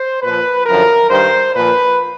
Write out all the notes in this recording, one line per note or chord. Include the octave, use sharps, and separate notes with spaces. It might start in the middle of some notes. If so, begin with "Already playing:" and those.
Already playing: C5
A#2 F3 B4
F#2 D3 F3 A#4
G2 D#3 C5
A#2 F3 B4